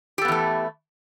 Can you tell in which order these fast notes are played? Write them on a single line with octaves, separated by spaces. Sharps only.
G4 A4 B3 E3 A3